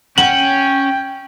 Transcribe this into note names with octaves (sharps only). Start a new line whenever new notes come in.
C#4 F#5 G5 F#7